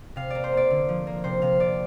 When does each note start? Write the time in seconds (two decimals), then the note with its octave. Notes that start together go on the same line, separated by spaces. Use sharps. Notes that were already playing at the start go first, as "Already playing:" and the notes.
0.16 C3 F5
0.30 A#3 D5
0.44 C5
0.52 A#3 D5
0.70 D3
0.89 F3
1.07 A#3
1.24 C3 C5
1.42 C3 F5
1.60 C3 D5